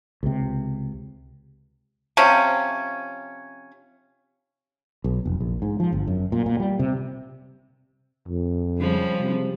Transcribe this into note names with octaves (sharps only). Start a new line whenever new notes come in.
C#2 C3
C3 F3 C#4
B1
F1
A#1
G#2
F3
G1
F#2
A#2
A#2
G3
C3
F2
C#3 F3 G3
C3